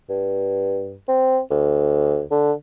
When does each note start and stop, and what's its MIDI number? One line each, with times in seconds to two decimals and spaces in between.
0.09 0.97 43
1.08 1.39 60
1.50 2.23 38
2.31 2.52 50